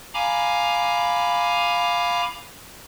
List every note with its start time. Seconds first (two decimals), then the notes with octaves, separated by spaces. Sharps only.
0.14 F5 G#5 A#5 B5 D6